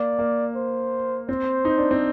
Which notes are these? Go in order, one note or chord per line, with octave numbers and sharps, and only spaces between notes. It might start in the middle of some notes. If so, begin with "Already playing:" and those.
Already playing: A#3 D5
A#3
C5
C4 C5
D#4
D4
C4